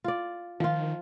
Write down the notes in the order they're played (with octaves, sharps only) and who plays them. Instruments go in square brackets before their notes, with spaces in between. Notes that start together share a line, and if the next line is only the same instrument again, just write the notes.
[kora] F4 D5
[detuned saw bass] D#3 [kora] F3 F4